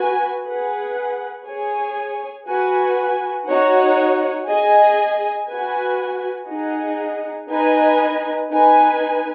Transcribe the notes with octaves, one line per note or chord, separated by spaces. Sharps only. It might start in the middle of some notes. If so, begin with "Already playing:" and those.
Already playing: F#4 B4 G#5
G#4 B4 F#5
G#4 C#5 G#5
F#4 B4 G#5
D#4 F#4 C#5 F#5
G#4 D#5 G#5
F#4 B4 G#5
D#4 G#4 D#5 F#5
D#4 B4 D#5 G#5
D#4 B4 G#5